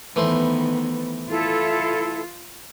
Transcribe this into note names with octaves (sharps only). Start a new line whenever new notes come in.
D#3 E3 A3 B3 C5
E4 F4 A4